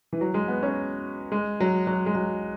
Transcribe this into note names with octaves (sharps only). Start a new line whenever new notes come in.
E3
F#3
G#3
B3
C#4
G#3
F#3
F#3
G#3
F#3